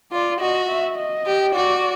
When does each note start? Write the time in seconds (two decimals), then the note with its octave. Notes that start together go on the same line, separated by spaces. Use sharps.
0.12 F4 D5
0.40 F#4 D#5
0.69 E5
0.98 D#5
1.26 G4
1.54 F#4 D5